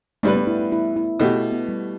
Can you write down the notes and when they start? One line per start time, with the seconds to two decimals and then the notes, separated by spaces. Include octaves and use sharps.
0.23 G2 G3 A3 D4 B4
0.35 B3
0.47 E4
0.59 E4
0.72 E4
0.96 E4
1.20 B2 A3 E4 G4
1.36 E4
1.52 B3
1.69 G3